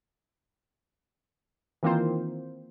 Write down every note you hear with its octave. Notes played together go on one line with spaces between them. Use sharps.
D#3 E3 A#3 C4 F4 C5